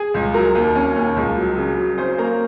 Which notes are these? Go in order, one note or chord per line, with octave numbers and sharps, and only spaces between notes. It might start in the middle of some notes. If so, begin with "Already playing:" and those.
Already playing: G#4 G#5
C#2
F#3 A#4 A#5
D#2
C#4
D#2
C#2
F#3
C#3
F#3
C#4 C5 C6
A#3 A#4 A#5